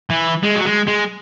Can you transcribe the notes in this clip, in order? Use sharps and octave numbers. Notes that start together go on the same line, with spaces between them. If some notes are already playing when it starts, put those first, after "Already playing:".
E3
G#3
F#3
G#3
G#3